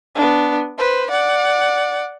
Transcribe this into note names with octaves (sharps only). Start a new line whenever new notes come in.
B3 D4
B4 C5
D5 F#5